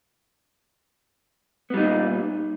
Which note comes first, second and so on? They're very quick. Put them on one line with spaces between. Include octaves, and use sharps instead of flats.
B3 G3 D#4 A#2